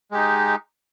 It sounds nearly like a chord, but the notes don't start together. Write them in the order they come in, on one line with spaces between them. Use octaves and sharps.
G#3 G4 D#4